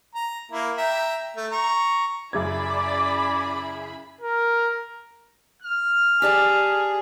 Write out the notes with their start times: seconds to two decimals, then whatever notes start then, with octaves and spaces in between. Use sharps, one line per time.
0.15 A#5
0.52 A#3 E4
0.78 E5 G5 A#5
1.37 A3
1.51 A#5 C#6
2.33 F#2 C#3 E4 G#4 D5 B5 D6 G#6
4.21 A#4
5.62 F6
6.22 G4 G#4 D5 A5